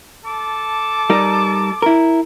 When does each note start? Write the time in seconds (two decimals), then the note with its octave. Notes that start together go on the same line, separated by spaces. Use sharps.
0.24 A4 A5 D6
1.10 G3 D#4 A#4
1.82 E4 A#4